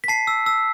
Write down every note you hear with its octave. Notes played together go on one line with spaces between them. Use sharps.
B6
A5 C7
E6
E6